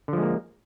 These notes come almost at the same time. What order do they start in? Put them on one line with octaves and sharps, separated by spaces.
D3 F3 G#3 A#3